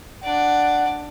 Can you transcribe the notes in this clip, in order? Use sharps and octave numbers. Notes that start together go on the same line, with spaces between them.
D4 D5 F#5